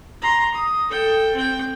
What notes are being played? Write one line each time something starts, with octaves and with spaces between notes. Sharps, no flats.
A#5 C6
D#6
A4 G5
C4 G5